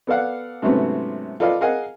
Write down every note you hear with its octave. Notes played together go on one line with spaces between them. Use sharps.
B3 A4 D5 F5 F#5
G#2 C3 F#3 A3 B3 C#4
F4 A4 B4 D5 D#5 F5
G#4 A#4 D#5 F5 F#5 G#5